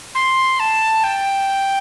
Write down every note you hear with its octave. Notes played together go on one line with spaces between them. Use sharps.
C6
A5
G5